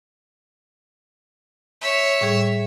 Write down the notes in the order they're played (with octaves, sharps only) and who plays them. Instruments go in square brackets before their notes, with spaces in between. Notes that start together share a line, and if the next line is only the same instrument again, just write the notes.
[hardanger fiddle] C#5 E5
[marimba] A2 G3 G#4